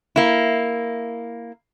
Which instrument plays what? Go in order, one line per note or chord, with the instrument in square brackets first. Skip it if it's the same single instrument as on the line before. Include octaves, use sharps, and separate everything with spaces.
[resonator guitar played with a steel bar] A#3 E4